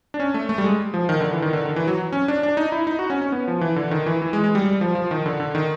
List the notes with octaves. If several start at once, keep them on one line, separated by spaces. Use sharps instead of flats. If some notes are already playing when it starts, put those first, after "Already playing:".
D4
C#4
A3
A3
G3
G#3
F3
D#3
D3
E3
D#3
D3
D#3
E3
F#3
C#4
D4
D4
D#4
E4
D#4
F#4
C#4
C#4
B3
F3
E3
D3
D#3
E3
E3
G#3
G#3
G3
G3
F3
F3
D#3
D3
D3
D#3